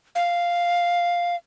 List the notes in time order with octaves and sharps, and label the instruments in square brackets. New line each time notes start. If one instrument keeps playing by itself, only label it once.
[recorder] F5